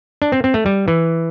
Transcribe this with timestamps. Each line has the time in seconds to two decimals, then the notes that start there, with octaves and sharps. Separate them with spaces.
0.22 D4
0.32 C4
0.44 C4
0.54 A3
0.66 G3
0.88 E3